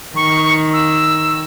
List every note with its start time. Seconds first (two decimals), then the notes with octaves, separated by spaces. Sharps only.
0.16 D#3 C#6
0.73 E6